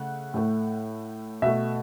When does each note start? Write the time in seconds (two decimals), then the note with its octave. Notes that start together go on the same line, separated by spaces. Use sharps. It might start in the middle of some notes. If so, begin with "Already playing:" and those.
Already playing: C#3 A3 F#5
0.34 A2 A3
1.42 B2 A3 E5